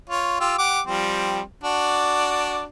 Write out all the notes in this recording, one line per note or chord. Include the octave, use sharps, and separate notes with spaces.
F4 C#5
F4 G4 E6
G4 F#5 D6
F3 G3 C4
D4 F#4 D5